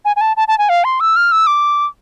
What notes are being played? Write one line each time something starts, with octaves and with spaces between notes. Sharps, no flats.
G#5
G#5
A5
A5
A5
G#5
F5
C6
E6
F6
E6
D6